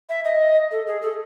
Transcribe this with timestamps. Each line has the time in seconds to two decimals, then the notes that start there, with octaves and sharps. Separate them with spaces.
0.10 E5
0.25 D#5
0.72 A4
0.87 G#4
1.02 A4